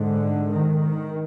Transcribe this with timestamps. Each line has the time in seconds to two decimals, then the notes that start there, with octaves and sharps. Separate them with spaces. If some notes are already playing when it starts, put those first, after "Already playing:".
Already playing: G#2 D3
0.50 D#3
0.79 D#3